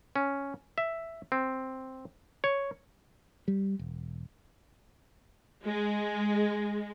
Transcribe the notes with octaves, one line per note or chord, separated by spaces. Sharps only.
C#4
E5
C4
C#5
G3
E1
G#3